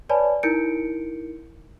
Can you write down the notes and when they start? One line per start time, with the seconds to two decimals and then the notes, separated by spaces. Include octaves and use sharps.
0.09 B4 C#5 D5 G#5 A5 B5
0.43 D#4 E4 A#4 G6 C#7 D7